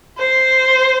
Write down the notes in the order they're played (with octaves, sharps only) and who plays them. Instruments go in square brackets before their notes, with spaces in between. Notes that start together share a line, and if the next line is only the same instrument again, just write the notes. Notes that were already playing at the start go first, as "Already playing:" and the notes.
[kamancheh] C5